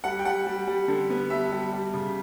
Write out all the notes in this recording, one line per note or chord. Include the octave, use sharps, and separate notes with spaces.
G3 F#5
G5
G3 F#5
G3
G3
D3
B3
G3 E5
G3
G3
C#3